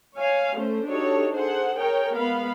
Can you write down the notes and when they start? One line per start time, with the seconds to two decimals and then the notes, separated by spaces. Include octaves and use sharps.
0.15 C#5 F5 G#5
0.56 A3 C#4 C5
0.86 D4 D#4 F#4 G4 A4 C#5
1.33 G#4 A4 C5 F#5
1.76 G#4 A#4 C#5 G5
2.14 G#3 B3 F5 B5